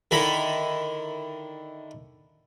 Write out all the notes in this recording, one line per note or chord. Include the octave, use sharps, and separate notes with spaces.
D3 D#3 E4 A4 A#5 B5